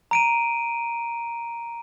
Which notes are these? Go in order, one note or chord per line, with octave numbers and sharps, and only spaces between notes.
A#5 D7 D#7